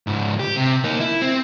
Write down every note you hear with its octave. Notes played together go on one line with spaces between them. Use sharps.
C#2 G#2
G4
C3
A#3 D#4
E4
C4